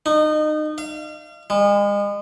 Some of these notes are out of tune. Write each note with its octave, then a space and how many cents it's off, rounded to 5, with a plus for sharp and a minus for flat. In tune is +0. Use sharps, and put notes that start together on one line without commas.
D#4 -25
F5 -35
G#3 -35